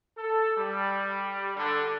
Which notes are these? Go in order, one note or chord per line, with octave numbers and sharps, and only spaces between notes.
A4
G3
D3